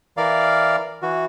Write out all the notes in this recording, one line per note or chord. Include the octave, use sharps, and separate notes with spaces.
E3 A#4 D5 F5
E3 F#4